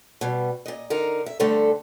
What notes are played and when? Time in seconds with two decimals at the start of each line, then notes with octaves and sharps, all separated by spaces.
0.21 B2 G3
0.66 A#2 D#5
0.90 D3 D#4 A#4
1.26 E5
1.40 D3 G3 A3 A4 C5